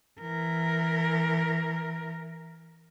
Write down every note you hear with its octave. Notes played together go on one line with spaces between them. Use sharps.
E3 A#4